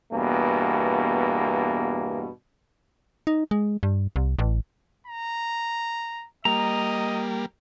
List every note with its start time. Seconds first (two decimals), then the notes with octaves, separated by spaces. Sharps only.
0.12 E2 G2 B2 A#3
3.27 D#4
3.51 G#3
3.83 G2
4.16 C2
4.39 A1
5.07 A#5
6.45 G3 A#3 D#5 A#5